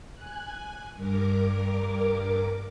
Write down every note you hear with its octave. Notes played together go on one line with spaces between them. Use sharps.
G#5 F#6
G2 A#4 D6